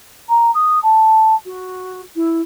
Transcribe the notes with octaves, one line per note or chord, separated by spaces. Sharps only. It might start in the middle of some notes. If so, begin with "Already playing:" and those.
A#5
D#6
A5
F#4
E4